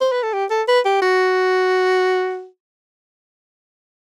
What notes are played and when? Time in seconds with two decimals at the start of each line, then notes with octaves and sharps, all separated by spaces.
0.01 C5
0.12 B4
0.23 A4
0.33 G4
0.50 A4
0.68 B4
0.85 G4
1.02 F#4